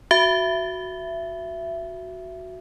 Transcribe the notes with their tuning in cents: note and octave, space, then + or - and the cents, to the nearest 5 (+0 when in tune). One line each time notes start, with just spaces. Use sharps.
F#4 +0 E5 +20